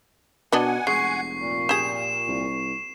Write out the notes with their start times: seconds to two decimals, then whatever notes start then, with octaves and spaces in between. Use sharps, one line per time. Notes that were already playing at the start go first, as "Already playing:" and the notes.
0.52 B2 B3 D4 D#5 F#5 G#5
0.87 F1 G#3 C#6 C7
1.39 A#2
1.69 G4 G#4 E7
2.28 C2